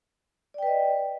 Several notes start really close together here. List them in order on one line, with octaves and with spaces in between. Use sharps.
D5 G5 B4 D#5